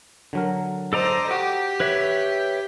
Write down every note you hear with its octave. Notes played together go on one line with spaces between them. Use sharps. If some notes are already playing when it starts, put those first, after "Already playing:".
D3 F#3 A#4
A4 C5 D5 D#5 A#5
F#4 G4 F#5 D6
B4 C#5 E5